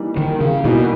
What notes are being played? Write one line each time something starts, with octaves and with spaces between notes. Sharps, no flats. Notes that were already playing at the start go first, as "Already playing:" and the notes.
Already playing: E3 G3 A#3 D#4
D#3
C#3
B2 E3 G3 A#3 D#4